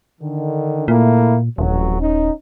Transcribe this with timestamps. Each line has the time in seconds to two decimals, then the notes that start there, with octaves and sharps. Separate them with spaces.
0.20 D3 D#3
0.88 A#2 A3 A#3 E4
1.58 D#1 A1 F2 F#3
2.00 C#4 D#4